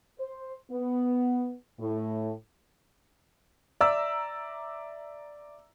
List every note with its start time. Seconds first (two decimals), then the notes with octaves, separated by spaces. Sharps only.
0.19 C5
0.71 B3
1.80 A2
3.81 D5 E5 A#5 E6